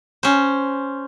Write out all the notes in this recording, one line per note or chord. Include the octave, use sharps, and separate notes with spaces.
C#4 C5